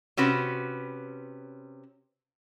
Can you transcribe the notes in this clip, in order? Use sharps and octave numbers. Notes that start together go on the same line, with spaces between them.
C3 C#4 F#4 B4